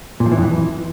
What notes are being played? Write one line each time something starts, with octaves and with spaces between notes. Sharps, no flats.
A#2
F3
E3
F2
E3